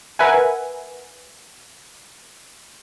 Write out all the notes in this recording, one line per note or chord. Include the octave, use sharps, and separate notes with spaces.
A#4 B4 E5 F#5 G#5